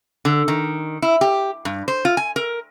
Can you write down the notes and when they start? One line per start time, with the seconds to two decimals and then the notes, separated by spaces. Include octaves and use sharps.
0.25 D3
0.48 D#3
1.02 E4
1.21 G4
1.65 G2
1.88 C5
2.05 F4
2.17 G#5
2.36 A#4